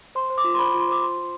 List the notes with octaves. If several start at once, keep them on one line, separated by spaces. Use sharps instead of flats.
C5 C6
C5
D6
F4
C6
C5 B5
F4 B5
C6
C5 D6
F4 C6
F4